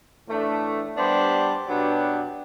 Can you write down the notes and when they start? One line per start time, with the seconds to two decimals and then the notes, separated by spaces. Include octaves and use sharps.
0.26 A2 E3 A3 D4
0.97 G3 B3 D4 G4 C5
1.67 B2 F#3 B3 D4 G4